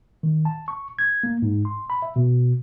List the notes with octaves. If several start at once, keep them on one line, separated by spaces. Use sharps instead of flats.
D#3
A5
C#6
G#6
A#3
G#2
C6
B5
E5
B2